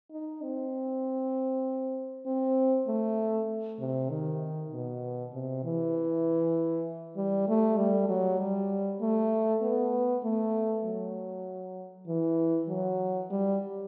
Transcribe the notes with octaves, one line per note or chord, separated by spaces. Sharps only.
D#4
C4
C4
A3
C3
D#3
B2
C3
E3
G3
A3
G3
F#3
G3
A3
B3
A3
F#3
E3
F#3
G3